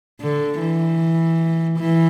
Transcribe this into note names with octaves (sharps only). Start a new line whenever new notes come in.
D3
E3
E3